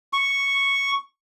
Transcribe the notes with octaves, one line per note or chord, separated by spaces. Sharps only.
C#6